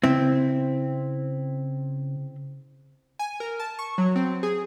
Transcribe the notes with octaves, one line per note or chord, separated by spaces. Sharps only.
C#3 C4 E4
G#5
A#4
A5
C#6
F#3
C4
G#4